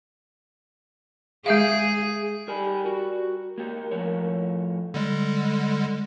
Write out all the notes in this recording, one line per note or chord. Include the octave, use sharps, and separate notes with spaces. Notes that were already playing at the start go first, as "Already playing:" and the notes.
G#3 G#4 E5 F5
G3 A#4 G#5 B5
F#4
A#4
A#3 G4
A2 F3 C#5
D3 G3 G#3